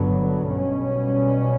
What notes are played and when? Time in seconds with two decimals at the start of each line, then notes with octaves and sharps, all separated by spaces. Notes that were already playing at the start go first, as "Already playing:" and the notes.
Already playing: G1 G2 D3 F#3 B3
0.49 B1 B2 G3 C#4